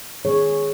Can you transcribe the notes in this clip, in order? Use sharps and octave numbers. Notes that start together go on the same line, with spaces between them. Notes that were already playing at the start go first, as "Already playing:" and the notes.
D#3 G#3 B3 G#4 C#5